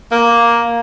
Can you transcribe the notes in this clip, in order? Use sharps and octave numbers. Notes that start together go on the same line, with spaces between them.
A#3